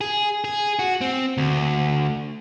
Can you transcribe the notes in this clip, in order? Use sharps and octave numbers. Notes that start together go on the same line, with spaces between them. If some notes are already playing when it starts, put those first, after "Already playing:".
G#4
G#4
F#4
C4
D2